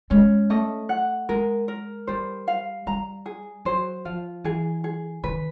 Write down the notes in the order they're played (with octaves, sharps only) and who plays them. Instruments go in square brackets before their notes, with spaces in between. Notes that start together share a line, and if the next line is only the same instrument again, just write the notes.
[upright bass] G#3 [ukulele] C#4
[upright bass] A3 [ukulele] D#5
[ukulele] F#5
[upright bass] G#3 [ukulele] A#4
[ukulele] A#4
[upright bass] G3 [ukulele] C5
[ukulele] F5
[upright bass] G3 [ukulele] A#5
[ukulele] G#4
[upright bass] F#3 [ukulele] C5
[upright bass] F3 [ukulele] F5
[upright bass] E3 [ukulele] G#4
[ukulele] G#4
[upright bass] D#3 [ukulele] B4